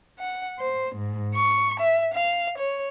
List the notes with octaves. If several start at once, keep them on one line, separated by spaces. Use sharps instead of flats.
F#5
C5
G#2
C#6
E5
F5
C#5